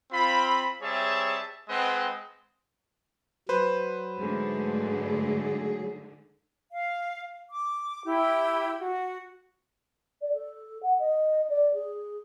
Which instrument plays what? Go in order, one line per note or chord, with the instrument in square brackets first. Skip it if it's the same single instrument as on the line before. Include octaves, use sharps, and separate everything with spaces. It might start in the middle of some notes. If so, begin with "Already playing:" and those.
[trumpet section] C4 F4 B5
G3 C4 G#4 C#5 E5 A5
G#3 C4 B4 D#5 F#5 G5
[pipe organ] F#3 [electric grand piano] B4 C5
[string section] G#2 D3 A3 [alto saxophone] G#4
[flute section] F5
D6
E4 G4
F#4
[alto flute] D5
A4
F#5
D#5
D5
G#4